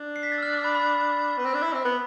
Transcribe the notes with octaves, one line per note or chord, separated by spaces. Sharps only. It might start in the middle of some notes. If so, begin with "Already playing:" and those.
Already playing: D4
C7
B6
A6
E6
F6
D6
B5
B5
B3
C4
D4
E4
C4
B3